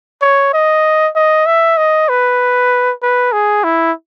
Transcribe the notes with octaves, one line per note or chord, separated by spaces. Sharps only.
C#5
D#5
D#5
E5
D#5
B4
B4
G#4
E4